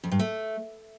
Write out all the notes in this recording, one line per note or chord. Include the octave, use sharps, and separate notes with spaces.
F2
G2
A3